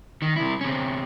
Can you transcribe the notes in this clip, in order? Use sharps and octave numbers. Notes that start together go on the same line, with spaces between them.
D#3
C2 E4
C3 C#4